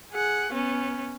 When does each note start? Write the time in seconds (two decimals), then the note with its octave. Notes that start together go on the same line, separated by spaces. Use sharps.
0.12 G#4 F#5
0.53 B3 C#4